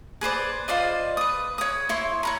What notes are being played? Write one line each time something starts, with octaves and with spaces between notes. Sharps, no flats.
G#4 B4 C5 D5
F4 C5 D5 D#5
B4 D#6
C#5 D#6
E4 C#5 C6
C#5 A#5 B5